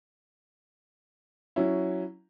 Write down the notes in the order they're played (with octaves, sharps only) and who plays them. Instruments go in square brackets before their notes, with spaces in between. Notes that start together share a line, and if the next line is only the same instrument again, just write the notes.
[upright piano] F#3 C#4 E4